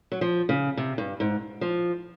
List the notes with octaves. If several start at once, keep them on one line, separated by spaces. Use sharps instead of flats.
F#3
F3
C#3
C3
G2
G#2
F3